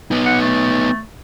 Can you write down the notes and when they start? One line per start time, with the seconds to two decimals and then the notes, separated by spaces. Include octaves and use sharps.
0.11 B3 D#4
0.26 F#5
0.41 A3